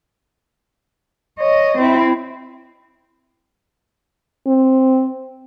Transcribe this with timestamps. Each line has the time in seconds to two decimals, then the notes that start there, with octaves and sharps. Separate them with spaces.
1.39 C#5 D#5
1.78 C4 E4
4.47 C4